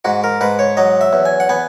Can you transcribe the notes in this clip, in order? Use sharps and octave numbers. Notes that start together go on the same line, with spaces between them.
G#2 F#4
A#4
G#2 B4
C#5
F#3 D#5
E5
E2
G#5
F#5
B3 G#5